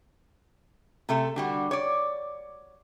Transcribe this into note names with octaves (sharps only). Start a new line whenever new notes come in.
C3 A3 A4
D3 G3 F#4
C#5 D5